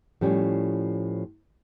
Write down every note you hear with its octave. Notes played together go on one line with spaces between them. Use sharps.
A2 F3 G3 C#4